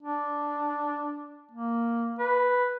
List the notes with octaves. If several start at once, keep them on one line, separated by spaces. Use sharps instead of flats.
D4
A#3
B4